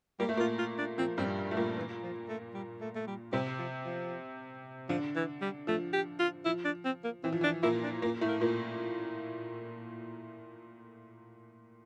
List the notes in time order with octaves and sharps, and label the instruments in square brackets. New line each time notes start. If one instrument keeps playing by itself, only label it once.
[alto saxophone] G3 [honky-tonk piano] A#3
[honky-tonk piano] A3
[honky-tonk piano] A#2 A#3 [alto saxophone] F4
[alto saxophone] F4
D4
[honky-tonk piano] F3 [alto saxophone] C4
[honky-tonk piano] G2 G3 [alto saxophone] C4
[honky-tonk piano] A3
[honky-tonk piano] A#2 A#3 [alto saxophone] G3
[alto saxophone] E3
F3
A3
G3
A3
A3
G3
[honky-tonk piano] C3 C4 [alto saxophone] G3
[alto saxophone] F3
F3
[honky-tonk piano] D3 D4 [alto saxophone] F3
[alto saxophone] E3
G3
[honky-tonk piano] F3 [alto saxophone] A3
[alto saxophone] G4
F4
[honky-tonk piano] F3 [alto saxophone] E4
[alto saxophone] D4
C4
A#3
[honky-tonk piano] E3 [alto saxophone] C4
[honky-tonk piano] F3
E3
[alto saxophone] D4
[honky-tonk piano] A#2 A#3 [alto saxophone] E4
[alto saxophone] D4
[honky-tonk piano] A#2 A#3
A2 A3
[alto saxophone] A#3
[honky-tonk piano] A#2 A#3